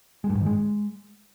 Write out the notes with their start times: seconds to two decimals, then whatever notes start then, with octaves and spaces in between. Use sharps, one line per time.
0.24 G#3
0.30 G2
0.35 G#2
0.41 D#3
0.46 G#3